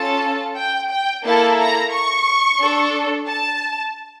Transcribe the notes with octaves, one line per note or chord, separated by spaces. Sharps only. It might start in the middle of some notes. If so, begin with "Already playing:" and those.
Already playing: C#4 F4 A4 A5
G5
G5
A#3 E4 A4 A5
A#5
C#6
D4 A4
A5